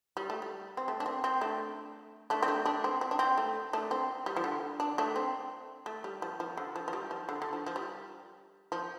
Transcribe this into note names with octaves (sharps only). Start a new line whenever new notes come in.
G3
A3
G3
C4
A3
D4
C4
C4
A3 D4
A3 D4
C4
A3 D4
A3 D4
C4
C4
D4
C4
A3
A3 D4
C4
G3
F3
D3
D4
A3 D4
C4
A3
G3
F3
F3
D3
F3
F3
G3
F3
D3
D3
F3
F3
G3
F3